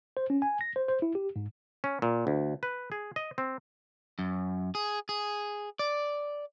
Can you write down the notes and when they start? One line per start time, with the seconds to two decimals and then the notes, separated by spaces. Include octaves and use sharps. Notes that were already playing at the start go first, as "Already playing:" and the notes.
0.17 C5
0.30 C#4
0.42 G#5
0.61 A#6
0.76 C5
0.88 C5
1.02 E4
1.15 G4
1.36 G#2
1.84 C#4
2.02 A#2
2.27 D2
2.63 B4
2.92 G#4
3.16 D#5
3.38 C4
4.19 F#2
4.75 G#4
5.09 G#4
5.79 D5